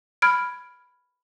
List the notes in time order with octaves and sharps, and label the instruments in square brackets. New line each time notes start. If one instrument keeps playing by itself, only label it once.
[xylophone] B5 F6 G#6 D7